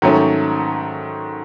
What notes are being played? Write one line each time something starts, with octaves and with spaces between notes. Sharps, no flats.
G#2 D#3 F#3 A3 C#4